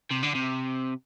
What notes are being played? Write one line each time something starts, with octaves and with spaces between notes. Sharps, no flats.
C3
D3
C3